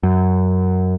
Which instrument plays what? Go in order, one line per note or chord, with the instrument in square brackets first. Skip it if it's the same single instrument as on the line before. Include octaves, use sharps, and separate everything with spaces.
[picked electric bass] F#2